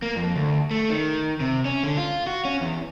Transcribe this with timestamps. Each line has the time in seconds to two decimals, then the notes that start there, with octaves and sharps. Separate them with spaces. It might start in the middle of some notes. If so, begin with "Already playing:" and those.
0.02 A#3
0.16 F2
0.36 D2
0.71 A3
0.90 D#3
1.40 C3
1.65 C#4
1.83 D3
1.97 F4
2.27 F#4
2.45 C#4
2.61 E2